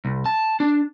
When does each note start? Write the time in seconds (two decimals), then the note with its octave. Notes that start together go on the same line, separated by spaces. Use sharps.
0.05 C2
0.26 A5
0.60 D4